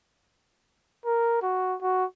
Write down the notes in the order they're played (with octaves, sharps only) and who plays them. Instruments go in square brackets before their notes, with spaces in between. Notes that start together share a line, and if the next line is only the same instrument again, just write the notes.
[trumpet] A#4
F#4
F#4